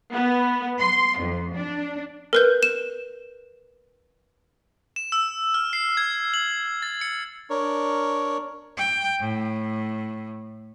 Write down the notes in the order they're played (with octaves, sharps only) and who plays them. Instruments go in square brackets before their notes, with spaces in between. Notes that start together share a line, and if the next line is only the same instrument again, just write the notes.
[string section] B3
C6
F2
D4
[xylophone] A#4 B4 G6
E7
[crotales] E7
E6
F6
C7
G#6
F#7
A6
C#7
[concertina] D4 A#4 C#5
[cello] G5
A2